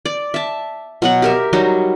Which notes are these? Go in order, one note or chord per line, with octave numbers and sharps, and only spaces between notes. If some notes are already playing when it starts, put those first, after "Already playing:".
D5
E5 A5
B2 F#3 F#5
G4 A#4 E5
F#3 G3 D#4 F#4